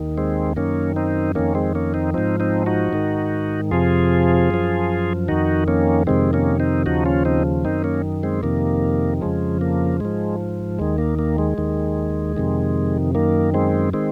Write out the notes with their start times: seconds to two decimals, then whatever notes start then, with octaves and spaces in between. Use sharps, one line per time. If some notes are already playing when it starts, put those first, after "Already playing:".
Already playing: D#2 D#3
0.18 G#3 C4
0.56 F#2 D#3 A#3 C#4
0.96 C4 D#4
1.35 F2 D#3 A#3 C#4
1.55 G#3 C4
1.75 A#3 C#4
1.94 C4 D#4
2.14 G#2 F3 C4 D#4
2.40 C4 D#4
2.66 D#4 F#4
2.93 G#2 D#3
3.71 F2 C3 F3 F4 G#4
4.50 F#2 F3
5.28 F2 D#3 D#4 F#4
5.68 A#3 C#4
6.07 F2 C3 D#3 G#3 C4
6.33 A#3 C#4
6.60 C4 D#4
6.86 D#2 C#3 F3 D#4 F#4
7.06 C#4 F4
7.25 C4 D#4
7.65 F#2 D#3 C4 D#4
7.84 A#3 C#4
8.23 G#3 C4
8.43 F2 C3 D#3 A#3
9.21 F2 C#3 F3 G#3
9.61 A#3
10.00 G#2 F3 G#3
10.79 D#2 D#3 G#3
10.98 A#3
11.19 A#3
11.38 G#3
11.58 D#2 D#3
12.36 F2 C3 D#3
13.15 F#2 D#3 A#3
13.54 G#3 C4
13.93 D#3 G#3 C4